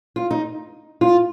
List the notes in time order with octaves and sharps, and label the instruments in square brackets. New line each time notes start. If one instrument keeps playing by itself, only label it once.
[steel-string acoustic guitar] F4
D#4
F4